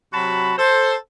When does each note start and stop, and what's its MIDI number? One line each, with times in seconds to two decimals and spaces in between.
0.13 0.52 48
0.13 0.52 54
0.13 0.52 66
0.13 0.52 81
0.13 0.52 83
0.57 0.95 69
0.57 0.95 72